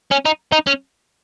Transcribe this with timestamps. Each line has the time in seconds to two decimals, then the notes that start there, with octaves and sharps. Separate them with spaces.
0.11 C#4
0.25 D#4
0.52 D#4
0.67 C#4